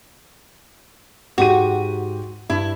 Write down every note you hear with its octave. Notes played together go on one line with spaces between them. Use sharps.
G#2 F#4 G4 D#7
G2 E4